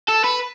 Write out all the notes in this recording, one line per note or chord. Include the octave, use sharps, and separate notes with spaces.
A4
B4